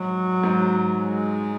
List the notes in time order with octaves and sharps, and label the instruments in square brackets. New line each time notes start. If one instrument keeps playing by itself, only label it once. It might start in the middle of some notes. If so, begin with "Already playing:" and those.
Already playing: [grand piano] G#2 [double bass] F#3
[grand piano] G#2
[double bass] G#3